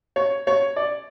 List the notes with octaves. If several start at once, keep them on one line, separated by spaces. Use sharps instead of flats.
C#5
C#5
D5